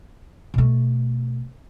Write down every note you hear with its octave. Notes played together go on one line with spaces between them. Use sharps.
B2 A3